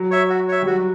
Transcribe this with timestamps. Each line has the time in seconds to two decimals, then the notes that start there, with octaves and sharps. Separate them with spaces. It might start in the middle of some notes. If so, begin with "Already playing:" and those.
Already playing: F#3
0.11 C#5 E5
0.30 F#4
0.48 C#5 E5
0.62 G3
0.67 F#3 F#4